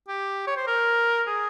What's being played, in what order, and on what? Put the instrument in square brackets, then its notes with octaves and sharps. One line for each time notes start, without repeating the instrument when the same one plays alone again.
[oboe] G4
C#5
C5
A#4
G#4